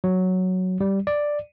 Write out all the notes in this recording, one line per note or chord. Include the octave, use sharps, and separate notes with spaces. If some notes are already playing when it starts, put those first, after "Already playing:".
F#3
G3
D5